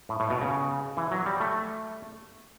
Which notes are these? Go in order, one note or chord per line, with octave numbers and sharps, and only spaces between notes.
A2
A2
B2
C#3
E3
F#3
G3
A3